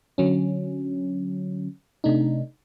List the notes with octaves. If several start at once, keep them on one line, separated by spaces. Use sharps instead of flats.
D3 F#3 C#4
C3 A3 D4 D#4